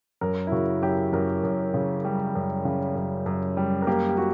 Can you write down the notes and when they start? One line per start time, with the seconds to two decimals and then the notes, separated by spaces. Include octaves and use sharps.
0.21 F#2 A#4
0.47 E4
0.52 C#3 F#4
0.82 F#2 G4
1.13 F#2 A#4
1.43 F#2
1.74 C#3
2.05 G3
2.35 F#2
2.65 C#3
2.96 F#2
3.26 F#2
3.57 G3
3.82 A#4
3.87 A#3 G4
4.09 G4
4.17 A#3 F#4